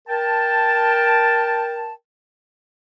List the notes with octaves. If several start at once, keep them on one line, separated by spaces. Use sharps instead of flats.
A#4 G5 A5